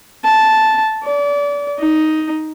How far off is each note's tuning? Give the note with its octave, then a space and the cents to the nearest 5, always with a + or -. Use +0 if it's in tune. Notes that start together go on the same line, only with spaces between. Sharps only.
A5 -5
D5 -30
D#4 +5